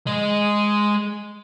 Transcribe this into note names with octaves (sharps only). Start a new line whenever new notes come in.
G#3 D#5